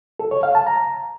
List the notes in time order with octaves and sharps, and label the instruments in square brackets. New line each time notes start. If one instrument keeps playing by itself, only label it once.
[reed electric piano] A4
C#5
F5
A5
A#5